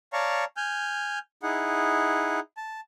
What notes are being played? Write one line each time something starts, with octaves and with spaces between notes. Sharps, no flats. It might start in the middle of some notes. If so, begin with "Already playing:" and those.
C#5 D5 F5 A5 A#5 C#6
G#5 F6 G6
D#4 E4 G#4 F#5
A5